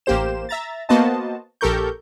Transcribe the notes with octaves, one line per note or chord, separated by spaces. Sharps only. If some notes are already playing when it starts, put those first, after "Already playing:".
A1 A#3 G4 C5 E7
E5 A#5 A6
A#3 B3 F#4 C5 D#5 A5
A#1 G4 A4 A#4 C#6 G6